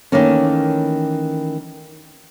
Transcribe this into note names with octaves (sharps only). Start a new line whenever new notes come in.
D#3 E3 A3 A#3 C#4